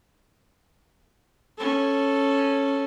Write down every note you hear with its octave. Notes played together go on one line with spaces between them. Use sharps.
C#4 A4